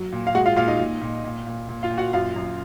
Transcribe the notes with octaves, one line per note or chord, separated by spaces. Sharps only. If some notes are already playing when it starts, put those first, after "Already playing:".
Already playing: F#3
A#2
F5
G#3 F#4 F#5
F4 F5
A#2 F4 F5
D#4 D#5
A#2
A#2
A#2
A#2
A#2
F4 F5
A#2
F#4 F#5
F#2 F4 F5
F#2